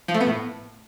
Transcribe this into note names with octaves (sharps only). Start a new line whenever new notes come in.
F3
A3
B3
A2